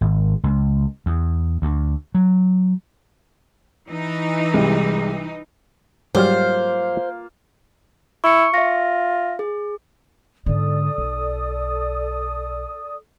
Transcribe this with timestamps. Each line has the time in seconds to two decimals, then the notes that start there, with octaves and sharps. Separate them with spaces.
0.01 G#1
0.43 C#2
1.06 E2
1.62 D2
2.15 F#3
3.88 E3 D#4
4.54 C2 G3 G#3
6.15 G#2 F#3 G3 A#3 F4 C5 F5
8.24 E4 C#6 C#7
8.54 F4 E5 A#6
9.39 G#4
10.46 G#2 D3 A4 D5 D#6
10.98 B1